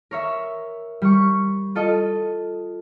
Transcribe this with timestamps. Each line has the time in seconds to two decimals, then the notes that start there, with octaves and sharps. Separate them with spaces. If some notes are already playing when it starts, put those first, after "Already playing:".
0.11 A#4 C#5 E5
1.02 G3 C#6
1.75 F4 A4 D#5